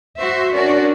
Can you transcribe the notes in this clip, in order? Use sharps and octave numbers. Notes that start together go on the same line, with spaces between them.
F#4 C5 E5
C#4 D4 F#4 A#4 D5